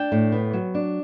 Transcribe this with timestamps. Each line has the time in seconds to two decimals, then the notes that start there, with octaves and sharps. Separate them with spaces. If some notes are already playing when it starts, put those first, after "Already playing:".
Already playing: D4 G5
0.12 A2
0.32 B3
0.53 F#3
0.75 D4